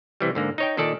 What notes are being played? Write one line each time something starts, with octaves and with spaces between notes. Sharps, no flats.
C3 E3 G3
G#2 D3 A#3
D#4 C#5 G5
A#2 D#3 A4 D5 A5